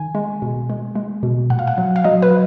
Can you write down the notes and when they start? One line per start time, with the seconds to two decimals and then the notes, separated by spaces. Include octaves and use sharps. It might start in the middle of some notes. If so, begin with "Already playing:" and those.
Already playing: D#3 G#5
0.15 G#3
0.42 B2
0.70 G#3
0.95 G#3
1.23 B2
1.50 A#2 F#5
1.59 F5
1.67 F#5
1.78 F#3
1.96 F5
2.04 F#3 D#5
2.22 B4
2.31 F#3